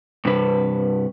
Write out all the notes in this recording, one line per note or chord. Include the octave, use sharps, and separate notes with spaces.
G2 C3 B4